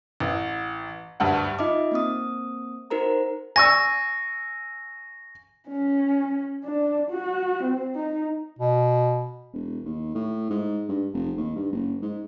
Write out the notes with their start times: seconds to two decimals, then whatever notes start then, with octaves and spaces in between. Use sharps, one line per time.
0.20 A1
1.20 D2 G2 F#5
1.59 D#4 F4 D#5 E5 D6
1.92 A#3 C4 D#6
2.90 D#4 F#4 A#4 C5 A#5
3.56 G#5 C#6 E6 A#6
5.69 C#4
6.65 D4
7.10 F#4
7.63 C4
7.95 D#4
8.59 B2
9.53 E1
9.85 D#2
10.15 A2
10.50 G#2
10.89 G2
11.14 F1
11.37 D#2
11.56 G2
11.72 F#1
12.02 G#2